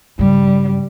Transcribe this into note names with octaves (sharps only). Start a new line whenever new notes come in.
G2 C#3 G3